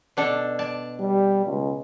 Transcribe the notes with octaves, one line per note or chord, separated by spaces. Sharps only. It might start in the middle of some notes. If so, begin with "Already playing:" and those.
B2 D4 A4
D5 A5
G3
C#2